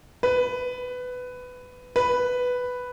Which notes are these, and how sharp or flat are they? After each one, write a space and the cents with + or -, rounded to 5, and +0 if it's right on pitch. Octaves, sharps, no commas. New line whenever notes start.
B4 +15
B4 +5